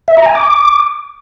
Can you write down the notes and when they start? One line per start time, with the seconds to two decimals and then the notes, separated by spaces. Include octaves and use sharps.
0.08 E5
0.17 A#5
0.26 G#5
0.35 D6